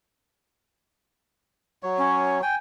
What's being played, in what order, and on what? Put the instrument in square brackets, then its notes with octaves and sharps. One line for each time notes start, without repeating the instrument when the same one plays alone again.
[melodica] F#3 C#5
[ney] C#4
[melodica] G5 [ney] G#5